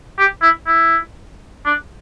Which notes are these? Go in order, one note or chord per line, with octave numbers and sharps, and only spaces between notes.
G4
E4
E4
D4